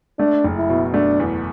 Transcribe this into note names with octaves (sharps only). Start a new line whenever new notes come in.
A3 D4
F#1
E4
B2
A3 D4
E2